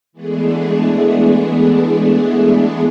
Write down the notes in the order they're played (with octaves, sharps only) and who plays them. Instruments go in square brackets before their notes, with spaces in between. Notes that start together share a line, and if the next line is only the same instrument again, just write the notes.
[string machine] E3 G#3 A3 B3 D4 G#4